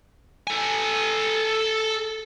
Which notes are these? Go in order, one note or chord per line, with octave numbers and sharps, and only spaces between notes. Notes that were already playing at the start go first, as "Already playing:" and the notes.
A4 G#5